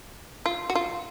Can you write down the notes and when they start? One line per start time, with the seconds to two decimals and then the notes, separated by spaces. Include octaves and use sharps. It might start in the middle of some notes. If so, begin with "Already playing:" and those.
0.46 F4
0.70 F#4
0.75 F4